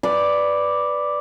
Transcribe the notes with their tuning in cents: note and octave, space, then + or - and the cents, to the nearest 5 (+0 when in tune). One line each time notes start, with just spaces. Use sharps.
B4 +0 D5 +0